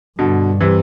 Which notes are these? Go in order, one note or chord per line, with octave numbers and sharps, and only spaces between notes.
G2 B2 D3
C3 E3